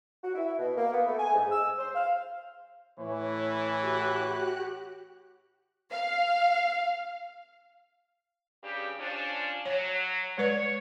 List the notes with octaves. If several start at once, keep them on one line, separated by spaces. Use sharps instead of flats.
F#4
E4
B2
A#3
B3
A3
G#5
G#2
E6
C5
F5
A2 E3 C#5
F#4 G4 F#6
F5
G2 C#3 G4
F3 C#4 D4
F#3 C#5
G#3 B4 C#5 D5